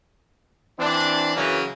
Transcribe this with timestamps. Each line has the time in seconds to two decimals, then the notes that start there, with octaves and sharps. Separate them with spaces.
0.79 E3 C4 D4
1.36 C#3 E3 F#3 A#3 C#4